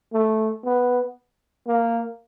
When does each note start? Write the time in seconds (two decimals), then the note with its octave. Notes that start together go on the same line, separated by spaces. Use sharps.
0.13 A3
0.65 B3
1.67 A#3